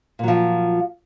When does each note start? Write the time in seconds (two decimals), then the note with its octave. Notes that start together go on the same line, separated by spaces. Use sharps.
0.19 A#2
0.23 F#3
0.28 F3